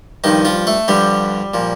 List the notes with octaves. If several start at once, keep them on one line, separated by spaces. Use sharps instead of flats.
G2 D#3 F3 D#4
F3 F4
A3 A4
G2 D3 F3 G3 G4
A#2 F3